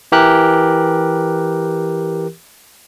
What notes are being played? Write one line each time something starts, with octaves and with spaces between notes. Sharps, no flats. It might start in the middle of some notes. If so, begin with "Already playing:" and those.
E3 G4 A#4 F#6